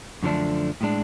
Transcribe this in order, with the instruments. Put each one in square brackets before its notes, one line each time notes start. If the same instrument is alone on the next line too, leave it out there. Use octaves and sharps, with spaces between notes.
[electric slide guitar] F#2 D3 F3 A3 D4
A2 G#3 D4